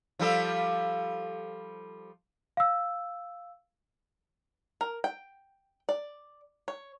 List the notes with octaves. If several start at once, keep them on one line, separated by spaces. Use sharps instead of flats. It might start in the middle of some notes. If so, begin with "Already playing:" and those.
F3 G3 A4
F5 E6
A#4
G5
D5
C#5